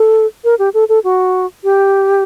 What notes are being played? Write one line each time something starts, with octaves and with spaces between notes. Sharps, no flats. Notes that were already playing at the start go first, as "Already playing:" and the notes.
Already playing: A4
A#4
G4
A4
A4
F#4
G4